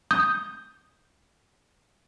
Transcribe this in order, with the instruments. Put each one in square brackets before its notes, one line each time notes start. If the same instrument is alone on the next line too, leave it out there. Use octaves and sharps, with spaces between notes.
[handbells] D#6 G6